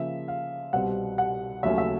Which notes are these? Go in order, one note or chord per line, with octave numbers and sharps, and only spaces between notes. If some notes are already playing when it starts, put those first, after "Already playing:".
Already playing: C#3 F3 A#3 E5
F5
C2 B2 G3 C4 F#5
F#5
D#2 C#3 F#3 A3 C#4 E5
E5